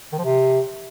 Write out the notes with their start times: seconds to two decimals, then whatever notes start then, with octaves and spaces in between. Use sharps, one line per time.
0.13 D#3
0.18 F3
0.24 C3